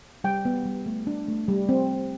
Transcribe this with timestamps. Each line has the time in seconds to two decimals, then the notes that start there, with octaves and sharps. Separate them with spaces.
0.24 G3 G5
0.45 B3
0.65 G3
0.86 A3
1.07 D4
1.28 A3
1.48 G3
1.69 C4